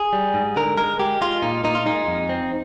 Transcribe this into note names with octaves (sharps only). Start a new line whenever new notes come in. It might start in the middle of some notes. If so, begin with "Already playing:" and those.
Already playing: G#4
G3
G#2
D3 A#4
G#3 A#4
G#3 G4
G#3 F4
A#2 D#4
A#2 D#4
F4
G#3 D#4
F2
C4